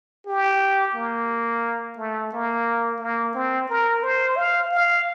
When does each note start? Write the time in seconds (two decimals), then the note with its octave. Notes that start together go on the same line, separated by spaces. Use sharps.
0.27 G4
0.95 A#3
1.98 A3
2.33 A#3
3.00 A#3
3.35 C4
3.69 A#4
4.03 C5
4.37 F5
4.71 F5